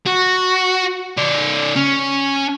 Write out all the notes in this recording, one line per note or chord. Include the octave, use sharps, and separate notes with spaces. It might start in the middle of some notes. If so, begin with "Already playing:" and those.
F#4
C#3 D5
C#4